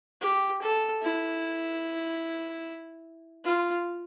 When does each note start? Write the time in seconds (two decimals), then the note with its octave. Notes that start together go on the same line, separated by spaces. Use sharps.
0.21 G4
0.62 A4
1.02 E4
3.44 F4